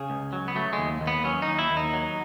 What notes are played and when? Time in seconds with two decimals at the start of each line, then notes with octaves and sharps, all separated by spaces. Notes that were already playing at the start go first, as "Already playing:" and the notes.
Already playing: C#3 G#4
0.10 C#2
0.33 F#3
0.48 B3
0.56 F#3 A3
0.73 G#3
0.78 D#2
1.01 D#2
1.07 B3
1.24 F#3 C#4
1.42 D#4
1.47 D#2
1.59 E4
1.70 D#2
1.77 D#4
1.93 F#3